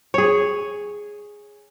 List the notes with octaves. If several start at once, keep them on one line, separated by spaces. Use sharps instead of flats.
G#4 C#5